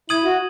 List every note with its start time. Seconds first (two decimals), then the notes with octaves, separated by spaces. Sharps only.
0.09 E4 D#6 G#6 D#7 F#7
0.24 F#4